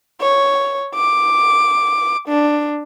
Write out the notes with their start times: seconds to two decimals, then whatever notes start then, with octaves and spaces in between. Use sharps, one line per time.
0.21 C#5
0.95 D6
2.28 D4